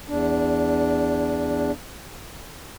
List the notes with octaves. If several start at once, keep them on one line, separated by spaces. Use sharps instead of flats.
E2 D4